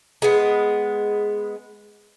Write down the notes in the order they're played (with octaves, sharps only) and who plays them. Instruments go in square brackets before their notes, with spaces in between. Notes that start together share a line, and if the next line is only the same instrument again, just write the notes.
[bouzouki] G#3 B3